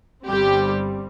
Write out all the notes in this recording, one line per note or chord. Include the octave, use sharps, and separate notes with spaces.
G1 G2 G3 C4 G4